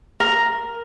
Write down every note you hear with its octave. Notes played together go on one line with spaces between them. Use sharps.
A#4